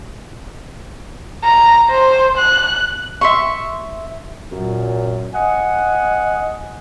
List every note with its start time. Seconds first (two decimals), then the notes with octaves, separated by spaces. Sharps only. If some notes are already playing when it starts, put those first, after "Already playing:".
1.44 A#5
1.90 C5
2.38 F#6
3.21 E5 C6 C#6
4.52 F#2 A#2 F#3
5.34 D#5 F#5 G#5